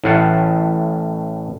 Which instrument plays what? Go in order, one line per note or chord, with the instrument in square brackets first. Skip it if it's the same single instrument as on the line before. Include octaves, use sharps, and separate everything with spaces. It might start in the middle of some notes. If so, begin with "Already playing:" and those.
[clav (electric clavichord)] A1 A2 F5 F#5 A5